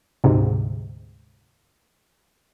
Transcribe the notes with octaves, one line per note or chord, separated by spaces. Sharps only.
D2 G#2 C3